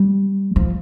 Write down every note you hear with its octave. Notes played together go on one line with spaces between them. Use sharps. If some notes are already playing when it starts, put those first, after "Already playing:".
Already playing: G3
F3